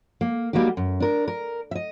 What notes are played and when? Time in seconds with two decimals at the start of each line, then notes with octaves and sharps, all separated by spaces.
0.21 A#3
0.53 G3 A#3 D#4 F#4 G4
0.77 F#2
1.00 D4 A#4
1.28 A#4
1.71 D#5 E5